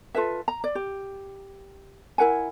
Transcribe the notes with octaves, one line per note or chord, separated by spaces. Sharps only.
F4 A4 B4 E5
A#5
D5
G4
E4 A#4 F#5 G#5